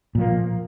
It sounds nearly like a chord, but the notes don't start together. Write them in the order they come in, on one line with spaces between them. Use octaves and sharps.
A#2 F3 A#3